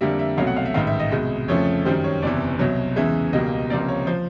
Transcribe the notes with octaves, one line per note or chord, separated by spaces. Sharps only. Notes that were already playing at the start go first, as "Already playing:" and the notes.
F2 D3 G3 A#3 E5
E5
C2 B2 F#3 A3 F5
F#5
F5
E5
A1 G#2 D#3 F5
E5
D#5
C2 B2 G#3
F2 C#3 F3 A3 C#5
F#2 D#3 G3 C5
C#5
F#1 E2 C3 E3 D5
C2 B2 F#3
E2 C#3 E3 G#3 E5
C#2 B2 G3 A#3 D#5
C#2 C3 F3 A#3 D5
C#5
F3 C5